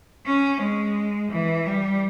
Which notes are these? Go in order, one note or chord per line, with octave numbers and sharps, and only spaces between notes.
C#4
G#3
E3
G3